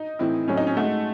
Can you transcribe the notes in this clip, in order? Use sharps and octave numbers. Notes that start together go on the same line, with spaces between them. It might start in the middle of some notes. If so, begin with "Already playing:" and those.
Already playing: D#4
A2 E3 C4 E4
A2 F#3 C4 C#4
D#4
C#4
G#3 A3 D#4 F#4